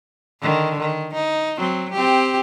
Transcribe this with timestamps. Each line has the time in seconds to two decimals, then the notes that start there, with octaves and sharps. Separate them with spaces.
0.41 D3 D#3
0.79 D#3
1.14 D#4
1.57 F#3 C4
1.92 C4 G4